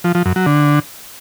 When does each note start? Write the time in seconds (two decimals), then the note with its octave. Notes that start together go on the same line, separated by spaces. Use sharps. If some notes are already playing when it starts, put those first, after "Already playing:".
0.04 F3
0.15 F3
0.25 F#2
0.36 F#3
0.46 D3